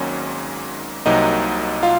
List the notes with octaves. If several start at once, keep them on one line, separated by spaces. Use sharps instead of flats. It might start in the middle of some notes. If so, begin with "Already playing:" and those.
Already playing: G#1 G#2 D#3 F#3 A#3 C#4 C#5
C2 C3 F#3 A#3 D#4 D#5
F4 F5